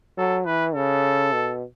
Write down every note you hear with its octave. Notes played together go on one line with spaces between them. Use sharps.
F#3 A4
E3 B4
C#3 A4
B2